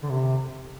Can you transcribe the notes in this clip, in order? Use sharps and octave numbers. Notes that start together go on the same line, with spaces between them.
D3
C3